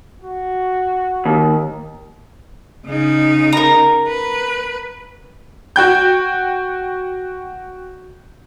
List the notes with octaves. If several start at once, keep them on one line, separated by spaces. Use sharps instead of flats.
F#4
D#2
C#3 D#4
A#4 A#5
B4
F#4 G5 G6